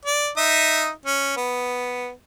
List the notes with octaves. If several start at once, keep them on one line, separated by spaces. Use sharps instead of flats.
D5
D#4 E5 D#6
C#4
B3